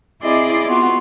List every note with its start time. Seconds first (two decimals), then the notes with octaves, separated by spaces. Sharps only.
0.22 C4 E4 G#4 D5 D#5 C6
0.66 B3 F4 F#4